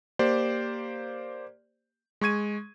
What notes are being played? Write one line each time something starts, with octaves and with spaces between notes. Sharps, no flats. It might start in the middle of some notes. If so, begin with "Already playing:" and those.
A#3 G4 C5 D5
G#3 C#6 G#6 D#7